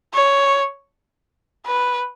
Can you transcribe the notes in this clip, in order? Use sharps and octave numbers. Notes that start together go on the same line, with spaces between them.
C#5
B4